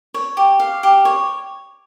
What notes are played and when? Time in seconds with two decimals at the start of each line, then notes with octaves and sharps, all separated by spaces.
0.14 C#5
0.37 G4
0.59 F5
0.83 G4
1.05 C#5